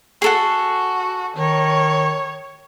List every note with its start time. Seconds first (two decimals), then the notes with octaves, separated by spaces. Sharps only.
0.22 F#4 G#4 A4 F#5
1.36 D#3 C#5